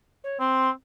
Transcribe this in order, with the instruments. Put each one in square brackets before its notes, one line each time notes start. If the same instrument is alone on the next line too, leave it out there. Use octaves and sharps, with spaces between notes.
[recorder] C#5
[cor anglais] C4 [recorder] C6